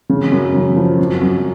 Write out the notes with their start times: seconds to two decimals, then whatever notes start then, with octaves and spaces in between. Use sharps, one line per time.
0.10 C#3
0.32 F#2
0.54 C#3
0.76 F3
0.99 F#2
1.21 F#2